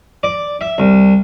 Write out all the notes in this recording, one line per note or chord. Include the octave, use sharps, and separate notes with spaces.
D5
E5
C2